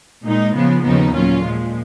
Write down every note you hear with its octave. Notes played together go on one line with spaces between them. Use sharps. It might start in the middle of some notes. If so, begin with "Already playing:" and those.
A#2 G#3 D#4
C#3 F3 B3
D#2 C#3 F3 B3 D#4
A#2 F#3 C#4 F4
A#2 F3 G#3